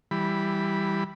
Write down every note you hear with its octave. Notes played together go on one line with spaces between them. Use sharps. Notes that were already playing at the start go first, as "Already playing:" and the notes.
E3 G3 B5